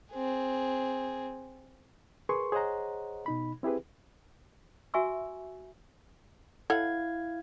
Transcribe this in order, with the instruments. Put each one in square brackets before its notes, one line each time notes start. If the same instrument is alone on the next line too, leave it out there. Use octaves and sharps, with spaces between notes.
[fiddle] C4 G#4
[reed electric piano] G#4 A#4 B4 C6 C#6
G#4 C5 C#5 D#5 F#5 A#5
B2 D#4 B5
C4 E4 G4 G#4 B4
[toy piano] F#4 E5 G#5 C#6 E6
[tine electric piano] E4 F5 G#6 [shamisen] A4 C#5 F#5